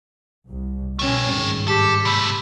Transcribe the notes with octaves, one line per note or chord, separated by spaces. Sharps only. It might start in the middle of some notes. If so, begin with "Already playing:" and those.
C2
B2 A3 C#4 G5
G#1 G2
G4 A4
C3 A3 B5